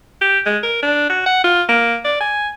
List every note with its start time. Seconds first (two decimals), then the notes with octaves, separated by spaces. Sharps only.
0.21 G4
0.46 G#3
0.63 A#4
0.83 D4
1.10 F#4
1.26 F#5
1.44 F4
1.69 A#3
2.05 D5
2.20 G#5